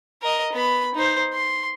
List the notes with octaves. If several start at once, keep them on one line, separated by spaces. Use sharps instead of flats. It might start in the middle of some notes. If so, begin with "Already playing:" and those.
A#4 D#5
B3 B5
D#4 C5
C6